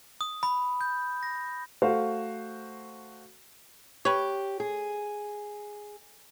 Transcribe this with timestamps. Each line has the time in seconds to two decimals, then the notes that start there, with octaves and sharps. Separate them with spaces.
0.21 D#6
0.43 B5
0.81 G6
1.23 A#6
1.82 A3 F#4 C5 F5
4.05 G4 B4 C#5
4.60 G#4